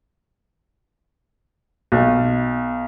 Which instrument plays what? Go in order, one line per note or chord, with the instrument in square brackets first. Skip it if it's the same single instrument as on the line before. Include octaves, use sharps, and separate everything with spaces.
[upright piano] B1